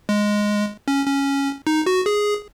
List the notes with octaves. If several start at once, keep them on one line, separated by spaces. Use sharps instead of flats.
G#3
C#4
C#4
D#4
F#4
G#4